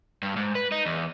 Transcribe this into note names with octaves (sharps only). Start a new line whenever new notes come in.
G2
G#2
B4
D#4
E2